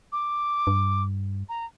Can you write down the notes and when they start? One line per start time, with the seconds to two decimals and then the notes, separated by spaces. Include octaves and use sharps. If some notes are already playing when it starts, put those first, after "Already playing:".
0.12 D6
0.67 G2
1.49 A#5